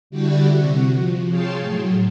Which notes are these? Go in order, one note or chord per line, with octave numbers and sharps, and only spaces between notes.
D3 G3 D4 E4 F#4 G4
C3 F#4
F3
G#4 C#5 F5 G5 A5 C6
A2 F#3